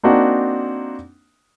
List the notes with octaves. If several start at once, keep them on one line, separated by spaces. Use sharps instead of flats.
A#3 C4 D4 D#4 F#4